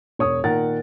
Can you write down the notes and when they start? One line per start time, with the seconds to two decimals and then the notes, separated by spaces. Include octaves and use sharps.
0.19 E1 C#5 D#6
0.44 A#2 D#3 A#4 F#5 A6